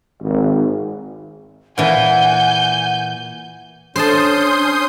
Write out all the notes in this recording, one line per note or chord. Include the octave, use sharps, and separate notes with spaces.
G#1
A#2 E3 F#5 G#5 G6
C#4 D4 C5 A5 C6 D#6 G6